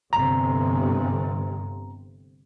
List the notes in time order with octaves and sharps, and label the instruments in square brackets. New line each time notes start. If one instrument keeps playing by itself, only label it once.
[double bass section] G1 G2 C3 [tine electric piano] A#5